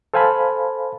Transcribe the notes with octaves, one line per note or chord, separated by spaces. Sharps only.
A4 C5 F5 G#5 A5 B5